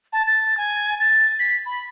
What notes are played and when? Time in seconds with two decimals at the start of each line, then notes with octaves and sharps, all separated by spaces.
0.13 A5
0.27 A6
0.57 G#5
1.00 A6
1.40 B6
1.66 B5